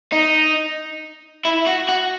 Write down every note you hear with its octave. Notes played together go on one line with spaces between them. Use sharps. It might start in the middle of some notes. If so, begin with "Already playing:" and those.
D#4
E4
F#4
F#4